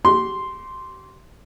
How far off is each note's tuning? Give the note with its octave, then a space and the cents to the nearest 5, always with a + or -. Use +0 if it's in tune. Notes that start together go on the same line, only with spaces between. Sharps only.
G4 -40 C6 +0